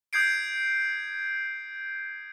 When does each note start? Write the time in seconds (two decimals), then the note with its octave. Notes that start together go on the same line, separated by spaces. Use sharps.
0.13 D#6 G6 G#6 C7 D7